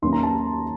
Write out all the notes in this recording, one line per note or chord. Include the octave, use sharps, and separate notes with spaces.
D#2 D#3 A#3 C#4 C6
A#5
A5